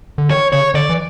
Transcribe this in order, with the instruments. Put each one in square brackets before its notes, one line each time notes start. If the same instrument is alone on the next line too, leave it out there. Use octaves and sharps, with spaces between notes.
[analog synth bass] D3
[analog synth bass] D#3 [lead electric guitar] C#5
[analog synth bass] C#3 [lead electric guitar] C#5
[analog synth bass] D3 [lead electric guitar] D5
[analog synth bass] E3